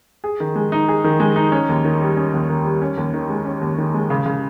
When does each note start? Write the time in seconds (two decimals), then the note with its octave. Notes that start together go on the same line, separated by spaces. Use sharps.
0.24 G#4
0.40 D#3
0.55 G#3
0.72 D#4
0.89 G#4
1.04 D#3
1.20 G#3
1.36 D#4
1.52 C#4
1.69 D#2
1.85 D#3
2.01 G3
2.17 C#4
2.34 D#2
2.49 D#3
2.65 G3
2.82 C#4
2.98 D#2
3.14 D#3
3.30 G#3
3.45 C#4
3.61 D#2
3.78 D#3
3.94 G#3
4.10 C#3
4.26 C#3